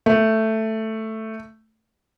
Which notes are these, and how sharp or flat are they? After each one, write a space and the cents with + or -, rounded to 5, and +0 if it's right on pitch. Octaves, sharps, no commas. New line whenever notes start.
A3 +5